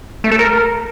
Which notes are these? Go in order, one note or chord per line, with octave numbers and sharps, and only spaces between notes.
A3
A4
A#4